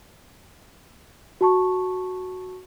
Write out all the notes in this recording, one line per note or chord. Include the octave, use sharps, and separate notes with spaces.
F#4 A5 C#6